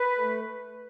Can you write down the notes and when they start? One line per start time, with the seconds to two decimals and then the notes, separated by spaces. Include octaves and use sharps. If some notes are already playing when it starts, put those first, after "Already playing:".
Already playing: B4
0.17 A3